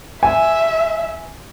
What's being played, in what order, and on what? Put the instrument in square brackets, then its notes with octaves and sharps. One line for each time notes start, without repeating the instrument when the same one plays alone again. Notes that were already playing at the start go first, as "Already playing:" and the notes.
[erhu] E5 [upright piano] G#5